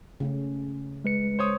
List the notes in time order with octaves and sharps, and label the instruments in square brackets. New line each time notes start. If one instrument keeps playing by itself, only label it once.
[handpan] C#3 A3 C#4
[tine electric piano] G#3 B4 C#7
[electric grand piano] C5 C#5 D#6